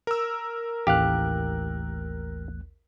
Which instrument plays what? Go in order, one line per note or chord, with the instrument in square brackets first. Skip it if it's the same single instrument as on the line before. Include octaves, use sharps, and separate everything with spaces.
[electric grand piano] A#4 E6
[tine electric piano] A1 D#2 F#6 [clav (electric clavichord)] G4 F5